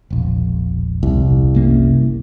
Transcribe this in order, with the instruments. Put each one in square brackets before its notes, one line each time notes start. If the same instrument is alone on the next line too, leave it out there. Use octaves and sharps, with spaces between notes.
[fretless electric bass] E1 A#1
[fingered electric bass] C2
[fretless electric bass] F#1 A#3 C#4